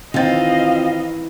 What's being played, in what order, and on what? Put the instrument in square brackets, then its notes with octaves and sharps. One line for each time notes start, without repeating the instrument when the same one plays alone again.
[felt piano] D#3 D#4 A6 [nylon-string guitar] E3 [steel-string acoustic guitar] C4 F4 [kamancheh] D#5 F5